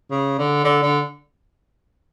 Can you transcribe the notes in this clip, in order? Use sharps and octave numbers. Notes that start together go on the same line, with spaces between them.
C#3
D3
D3
D3